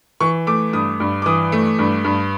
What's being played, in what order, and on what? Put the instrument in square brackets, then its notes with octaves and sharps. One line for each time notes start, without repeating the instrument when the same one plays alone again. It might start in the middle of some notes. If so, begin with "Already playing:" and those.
[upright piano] E3 C#6
A3 D6
G2 D#6
G2
D6
E3 D#6
A3
G2
G2